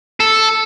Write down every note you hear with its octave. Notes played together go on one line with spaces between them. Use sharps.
A4